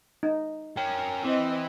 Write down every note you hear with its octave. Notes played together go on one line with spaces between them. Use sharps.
D#4
C#4 A#4 G5
E3 C4 D#5